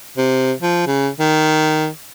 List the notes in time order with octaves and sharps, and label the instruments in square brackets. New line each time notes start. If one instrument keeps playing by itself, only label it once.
[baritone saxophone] C3
F3
C#3
D#3